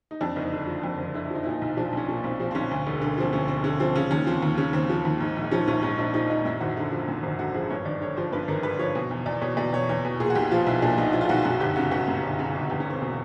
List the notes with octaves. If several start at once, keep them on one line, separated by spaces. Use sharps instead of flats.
D#4
F2 D4
F#1 D#4
D3
F3
F2
F#1
D3 E4
E4
F3 D#4
E4
A#2 D#4
B1
F3 D4
B1 C#4
A#2 C#4
B1 C4
F3 C4
C4
B1 C#4
D2
E1
D3
F3 C4
D2 C#4
E1 C4
D3 C#4
F3 C4
C#3 C#4
D#2 C#4
F3 C4
D#2
C#3 C#4
D#2 C4
F3
D#2
G#2
A#1
F3 C#4
A#1 C#4
G#2 C#4
A#1 D4
F3 D#4
A#1 D#4
F#2 E4
G#1 F#4
D3
F3
F#2
G#1
D3 F#4
F3 G#4
G2 C#5
G#1 D5
D3 C#5
F3 C5
G2 B4
G#1 A#4
D3 B4
F3 C#5
B2
E2
E2 D5
B2 C#5
B2 D5
E2 C#5
E2 C#5
B2
A#2 G#4
F#4
B1 G4
F3 F4
B1 E4
A#2 D4
B1 D#4
F3 E4
F4
B1 F#4
F#2 F#4
G1 G4
C#3 F#4
G1 F#4
F#2
G1
C#3
G1
E2 G4
C#4
E1 C4
B2